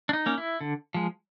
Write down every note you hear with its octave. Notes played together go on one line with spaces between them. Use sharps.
D4
D#4
A#3 C#4
E4
D3
F3 G#3